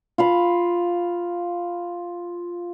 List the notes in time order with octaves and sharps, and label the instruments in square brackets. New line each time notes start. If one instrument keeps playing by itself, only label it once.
[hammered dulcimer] F4 F5 B5